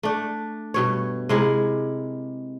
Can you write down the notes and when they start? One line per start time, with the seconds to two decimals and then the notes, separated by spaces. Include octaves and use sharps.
0.03 A3 D4
0.74 G2 B2 C#5
1.29 C3 G#3 E4 A#4